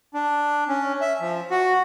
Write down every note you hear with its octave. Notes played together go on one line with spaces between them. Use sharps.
D4
C#4
E5
F3
F#4